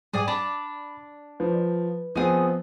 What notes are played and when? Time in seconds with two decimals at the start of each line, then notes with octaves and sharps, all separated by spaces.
0.14 G#2 G3 G#4 D5 G#5
0.28 D4 D5 B5
1.40 F3 B4
2.15 F3 B3 C4 D#4 G#4